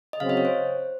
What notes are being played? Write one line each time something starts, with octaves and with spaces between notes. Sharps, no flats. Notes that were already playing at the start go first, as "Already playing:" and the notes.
D#5
C#3 F#3 C4 F5
D#5
C#5
C5